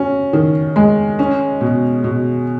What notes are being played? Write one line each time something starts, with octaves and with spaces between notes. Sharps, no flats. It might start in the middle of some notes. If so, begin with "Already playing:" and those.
Already playing: C#4 F#4
D#3
G#3
C#4
B2
B2